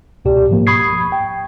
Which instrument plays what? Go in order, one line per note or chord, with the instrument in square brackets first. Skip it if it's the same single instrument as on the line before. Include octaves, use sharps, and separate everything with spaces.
[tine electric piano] C#2 B2 G4 D5
G#2 F3 A#3
B5 C#6 D#6 G#6 C7
G5